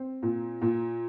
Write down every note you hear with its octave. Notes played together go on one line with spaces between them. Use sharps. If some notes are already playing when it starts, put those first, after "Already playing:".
Already playing: C4
A#2
A#2